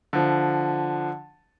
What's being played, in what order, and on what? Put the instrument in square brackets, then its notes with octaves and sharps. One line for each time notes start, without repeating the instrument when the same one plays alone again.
[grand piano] D3 F3